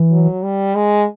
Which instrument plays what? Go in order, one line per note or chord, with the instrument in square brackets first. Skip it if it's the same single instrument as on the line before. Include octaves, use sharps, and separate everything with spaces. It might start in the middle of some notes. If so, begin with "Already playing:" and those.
Already playing: [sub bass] E3
[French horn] F#3
G3
G#3